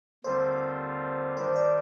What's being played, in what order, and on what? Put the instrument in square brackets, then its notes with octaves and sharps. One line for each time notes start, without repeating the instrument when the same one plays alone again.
[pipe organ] D#2 D3 G3 C4 F4 [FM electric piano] C5
[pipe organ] G2 D#3 G3 D4 [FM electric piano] C5
[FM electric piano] D5